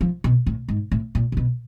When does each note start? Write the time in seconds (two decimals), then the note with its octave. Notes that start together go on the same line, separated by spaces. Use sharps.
0.01 F3
0.24 B2
0.46 A2
0.68 G#2
0.92 A2
1.15 A#2
1.32 C3
1.37 B2